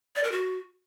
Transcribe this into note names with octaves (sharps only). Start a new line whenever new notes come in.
D5
A#4
F#4